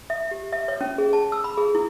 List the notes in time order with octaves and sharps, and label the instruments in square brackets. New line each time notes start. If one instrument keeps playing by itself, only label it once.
[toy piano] E5
G4
E5
C#5
C#4
G#4
A5
E6
B5
G#4
E4